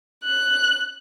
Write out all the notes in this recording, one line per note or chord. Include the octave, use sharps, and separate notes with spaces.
F#6